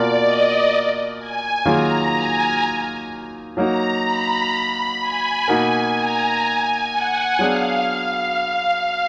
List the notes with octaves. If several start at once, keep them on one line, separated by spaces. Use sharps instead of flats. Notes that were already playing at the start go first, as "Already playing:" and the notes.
Already playing: B2 A#3 F4 A#4 D5
D#5
G#5
D#3 F#3 A#3 F4 G#4 A#5
G#5
F#3 A#3 D#4 F#4 A#5
B5
B5
G#5
B2 A#3 D#4 F#4 A#4 G#5
A#5
G#5
F#5
F#3 B3 D4 G#4 F5
F5